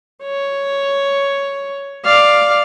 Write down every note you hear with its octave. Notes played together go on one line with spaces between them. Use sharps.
C#5
D5 F5